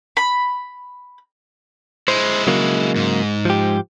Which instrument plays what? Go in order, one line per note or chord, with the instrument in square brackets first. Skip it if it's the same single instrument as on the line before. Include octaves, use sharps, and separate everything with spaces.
[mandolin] B5
[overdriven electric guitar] G#3 E4 [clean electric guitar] C5
[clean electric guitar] C#3 F#3 A#3
[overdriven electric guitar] G#2
[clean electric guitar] F3 G4